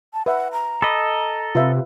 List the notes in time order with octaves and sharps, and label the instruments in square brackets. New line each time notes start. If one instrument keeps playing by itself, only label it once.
[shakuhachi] A5
[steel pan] B4 E5 [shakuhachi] F#5
[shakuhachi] A#5
[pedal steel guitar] A4 D#5 [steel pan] B5 D6
[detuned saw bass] C3 [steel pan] F4 B4 E5